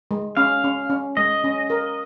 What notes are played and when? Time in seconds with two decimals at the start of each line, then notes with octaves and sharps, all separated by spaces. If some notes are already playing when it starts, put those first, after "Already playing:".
0.11 G#3
0.37 C#4 F5
0.64 C#4
0.90 C#4
1.17 G#3 D#5
1.44 C#4
1.70 A#4